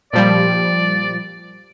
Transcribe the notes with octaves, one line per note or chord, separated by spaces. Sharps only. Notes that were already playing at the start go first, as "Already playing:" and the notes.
A#2 F3 G3 D5